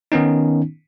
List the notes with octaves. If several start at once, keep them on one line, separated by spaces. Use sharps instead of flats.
D#3 B3 C#4 D#4